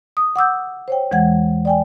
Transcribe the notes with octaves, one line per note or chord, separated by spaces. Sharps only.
D#6
F#5 D6 E6 G6
C5 C#5 G5
E2 E3 G#3 F#5 G#6
D5 G5 G#5